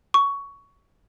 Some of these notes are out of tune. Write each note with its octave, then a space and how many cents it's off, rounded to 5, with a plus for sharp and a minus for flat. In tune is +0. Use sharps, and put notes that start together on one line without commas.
C#6 +15